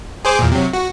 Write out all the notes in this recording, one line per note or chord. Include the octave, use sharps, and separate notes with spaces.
G#4 C5 D6
E2 A#2
C3 F#3
F#4